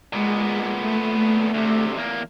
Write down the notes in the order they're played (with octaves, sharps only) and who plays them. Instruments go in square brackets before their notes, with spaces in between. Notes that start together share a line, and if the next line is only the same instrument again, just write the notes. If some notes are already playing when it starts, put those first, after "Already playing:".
[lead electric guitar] A#2 B3 [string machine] G#3
[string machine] A3
[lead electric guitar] D2 C3
E2 A#3